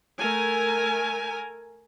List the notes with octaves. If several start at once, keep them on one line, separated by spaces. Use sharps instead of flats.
A3 A#4 G#5